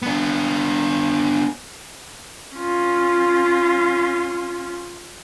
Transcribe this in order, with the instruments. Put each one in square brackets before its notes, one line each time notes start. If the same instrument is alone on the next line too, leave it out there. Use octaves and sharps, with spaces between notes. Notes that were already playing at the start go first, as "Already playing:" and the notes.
[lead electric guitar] B3 D4
[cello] C#4 F4